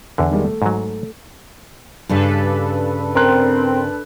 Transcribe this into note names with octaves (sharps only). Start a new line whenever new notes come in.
E2 D3
D#3 G3 G#3
A3
G#2 F#3
G2 C#3 G3 D4 A4 B4
C4 A#4 C6 F#6